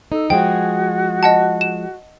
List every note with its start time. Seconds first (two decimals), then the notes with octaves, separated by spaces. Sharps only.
0.12 D#4 A4
0.30 F3 G#3 F#4 G#4 G5
1.23 D#5 F#5 A5
1.61 E7